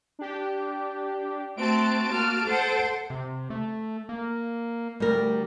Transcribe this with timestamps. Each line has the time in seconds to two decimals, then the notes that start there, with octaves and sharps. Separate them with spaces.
0.19 D4 G4
1.57 A3 C4 F#4 A5 D7
2.11 A#3 F#4 F6
2.45 A4 C5 F#5
3.10 C3
3.50 A3
4.09 A#3
5.00 D2 G3 A#4